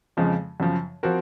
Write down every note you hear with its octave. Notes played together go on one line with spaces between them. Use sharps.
F2 C#3 F3 G#3
F#2 C#3 F3
F3 C4 F#4 A#4